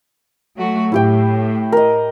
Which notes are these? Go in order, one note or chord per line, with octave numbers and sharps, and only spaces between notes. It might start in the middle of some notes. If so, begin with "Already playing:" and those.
F#3 A3 F#4
A2 E4 G4 G5
A#4 D#5